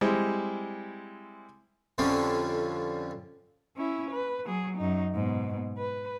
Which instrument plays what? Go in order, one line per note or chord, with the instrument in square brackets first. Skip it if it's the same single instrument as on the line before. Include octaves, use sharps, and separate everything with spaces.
[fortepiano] G3 G#3 C4 E4
[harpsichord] F2 D3 F3 G3 C#4
[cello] C#4 E4
B4
F#3 G#4
F#2 D#4
G#2 B2
B4